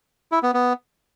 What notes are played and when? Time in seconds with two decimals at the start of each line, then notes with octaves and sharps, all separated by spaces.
0.32 E4
0.43 B3
0.54 B3